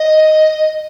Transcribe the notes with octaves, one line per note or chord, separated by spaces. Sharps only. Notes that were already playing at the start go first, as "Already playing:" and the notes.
Already playing: D#5